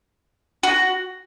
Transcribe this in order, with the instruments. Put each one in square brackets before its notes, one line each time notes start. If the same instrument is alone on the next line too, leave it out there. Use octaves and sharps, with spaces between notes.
[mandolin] F#4